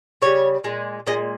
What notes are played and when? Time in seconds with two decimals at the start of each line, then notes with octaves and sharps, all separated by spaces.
0.22 C#3 G3 C#5
0.64 A#2 G#3
1.07 A#2 G#3 D#5